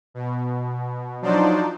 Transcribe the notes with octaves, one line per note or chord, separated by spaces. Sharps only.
B2
F3 F#3 D4 D#4 C5 D5